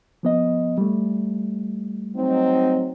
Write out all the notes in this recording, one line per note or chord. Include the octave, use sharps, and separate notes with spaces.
F3 B3 D#5
G3 A3
F#3 C4 D#4